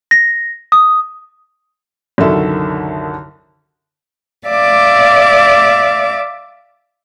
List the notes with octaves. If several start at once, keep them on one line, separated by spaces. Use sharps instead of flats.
A#6
D#6
C2 F#2 D3 D#3 A4 E5
D5 E5 F5 D6